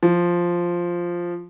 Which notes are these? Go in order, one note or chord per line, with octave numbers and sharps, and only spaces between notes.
F3